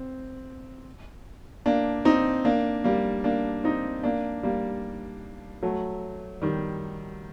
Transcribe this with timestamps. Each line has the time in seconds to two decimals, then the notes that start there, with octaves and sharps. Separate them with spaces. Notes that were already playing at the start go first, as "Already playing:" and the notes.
Already playing: C4
1.66 A#3 D4
2.05 C4 D#4
2.45 A#3 D4
2.84 G3 A#3
3.24 A#3 D4
3.64 C4 D#4
4.04 A#3 D4
4.43 G3 A#3
5.63 F#3 A3
6.42 D#3 G3